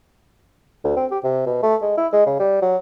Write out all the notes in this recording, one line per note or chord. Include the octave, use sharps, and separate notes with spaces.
D2
C4
G4
C3
B2
A3
G#3
E4
G#3
C#3
G3
F#3